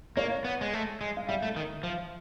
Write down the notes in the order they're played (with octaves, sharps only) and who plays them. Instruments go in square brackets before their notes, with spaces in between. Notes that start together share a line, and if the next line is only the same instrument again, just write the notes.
[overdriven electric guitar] A#3 [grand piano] C#5
[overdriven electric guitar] B3
G#3
A3
G#3
[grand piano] F5
[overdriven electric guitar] G3 [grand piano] E5
[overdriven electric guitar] A3
D#3
F3